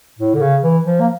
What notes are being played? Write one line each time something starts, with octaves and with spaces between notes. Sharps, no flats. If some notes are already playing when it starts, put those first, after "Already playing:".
A2
D3
C#3
E3
F3
A#3